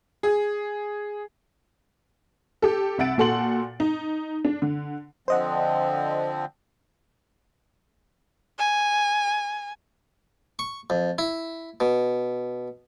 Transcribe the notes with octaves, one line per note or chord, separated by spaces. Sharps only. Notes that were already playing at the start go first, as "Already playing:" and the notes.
G#4
G4 A4
C2 E5 F#5 A6 D7
A#2 F#4 A4 F#5 C6 F#7
D#4
D4
D3
D3 F3 C4 C5 D#5 F#5
G#5
C#6
F2
E4
B2